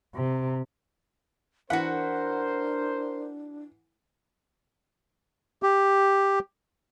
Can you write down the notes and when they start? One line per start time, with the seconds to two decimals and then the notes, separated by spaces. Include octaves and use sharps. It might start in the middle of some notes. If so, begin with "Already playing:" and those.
0.15 C3
1.70 E3 D4 F#4 A#4 C5 F#5 B5
5.63 G4